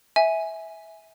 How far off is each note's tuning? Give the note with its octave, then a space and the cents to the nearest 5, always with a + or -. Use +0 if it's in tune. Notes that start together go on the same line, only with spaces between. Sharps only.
E5 -15 G#5 +0